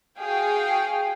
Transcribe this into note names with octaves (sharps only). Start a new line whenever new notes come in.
F#4 G#4 F5 G5 G#5